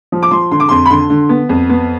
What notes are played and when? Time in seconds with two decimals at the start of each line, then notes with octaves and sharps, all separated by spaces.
0.12 F3
0.23 D6
0.31 F3 C6
0.51 D3 C6
0.60 D6
0.69 F2 C6
0.86 B5
0.90 D3 C6
1.10 D3
1.29 B3
1.49 F2
1.69 B3